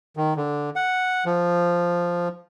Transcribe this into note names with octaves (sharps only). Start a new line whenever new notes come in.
D#3
D3
F#5
F3